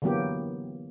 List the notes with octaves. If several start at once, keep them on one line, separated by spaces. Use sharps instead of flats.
D3 E3 F#3 A#3 B3 G4